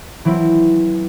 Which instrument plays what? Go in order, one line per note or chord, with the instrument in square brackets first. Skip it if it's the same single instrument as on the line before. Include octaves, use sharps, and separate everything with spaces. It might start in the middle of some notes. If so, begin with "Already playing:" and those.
[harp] E3 F#3 C4 E4